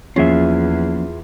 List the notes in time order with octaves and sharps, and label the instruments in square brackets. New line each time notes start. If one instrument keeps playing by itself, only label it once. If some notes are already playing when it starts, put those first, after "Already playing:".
[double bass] E2 [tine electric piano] F3 A#3 [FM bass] C#4 [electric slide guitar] F4 G#4 E5